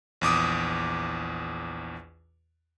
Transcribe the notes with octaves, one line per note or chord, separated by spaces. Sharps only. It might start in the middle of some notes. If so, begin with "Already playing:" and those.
A#1 E2 D6 D#6